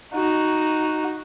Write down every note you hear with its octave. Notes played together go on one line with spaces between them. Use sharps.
D#4 F#4